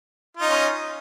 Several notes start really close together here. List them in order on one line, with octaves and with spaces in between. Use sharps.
F4 D#4 C#4